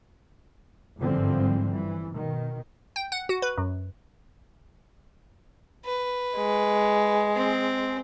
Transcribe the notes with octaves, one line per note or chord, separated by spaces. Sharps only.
G1 G#2 D3 E3 F3 C4
G2 E3
B2 D#3
G5
F#5
F#4
B4
F#2
B4
G#3
C4